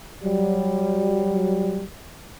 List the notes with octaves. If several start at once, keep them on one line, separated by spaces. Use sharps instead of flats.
F#3 G3